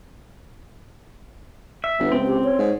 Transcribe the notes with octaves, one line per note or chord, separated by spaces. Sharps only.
E5
G1 B3
C#2 C4
G4
C#5
G#2